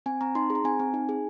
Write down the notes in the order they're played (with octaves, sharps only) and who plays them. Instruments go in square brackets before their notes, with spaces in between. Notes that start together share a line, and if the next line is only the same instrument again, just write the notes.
[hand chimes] C4 G#5
C4 A#5
D#4 C6
G#4
A#5
C4 G#5
C4
D#4
G#4